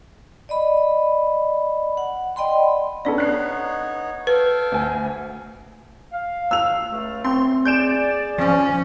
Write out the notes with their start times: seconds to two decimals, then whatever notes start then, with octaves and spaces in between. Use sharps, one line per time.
0.49 D5 D#5 B5
1.97 F#5
2.36 D5 D#5 G5 B5 C6
3.05 B3 C#4 D4 A4 D5
3.18 B3 D#4 C#5 F#6 C7
4.27 A4 B4 F5 G5
4.72 D2 G#5
6.12 F5
6.51 E6 F7
6.92 C#2 A3
7.24 C4 C6
7.65 G#4 D5 G6 D7 E7
8.38 F3 C#4